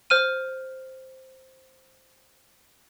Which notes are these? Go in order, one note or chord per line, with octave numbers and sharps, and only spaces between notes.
C5 F6 D#7